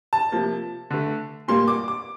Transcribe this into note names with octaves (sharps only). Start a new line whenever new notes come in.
A5
C3 F3 A#3
D3 A3
A#2 G3 A#3 C6
D6
D6